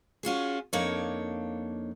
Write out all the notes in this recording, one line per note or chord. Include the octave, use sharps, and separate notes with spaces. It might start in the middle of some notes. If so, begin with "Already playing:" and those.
C#4 F4 F#4 G#4
F2 A#3 D4 D#4 C#5